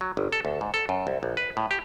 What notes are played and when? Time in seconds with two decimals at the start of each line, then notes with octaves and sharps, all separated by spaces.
0.01 F#3
0.17 G1
0.32 A4
0.45 D2
0.61 G#2
0.74 A4
0.89 F#2
1.07 C2
1.23 A#1
1.37 B4
1.57 A2
1.71 G4